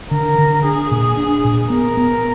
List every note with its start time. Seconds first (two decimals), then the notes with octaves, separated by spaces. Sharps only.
0.11 D3 A#4
0.38 D3
0.65 D4 G#4
0.91 A#2
1.17 D4
1.45 A#2
1.70 B3 A#4
1.97 B3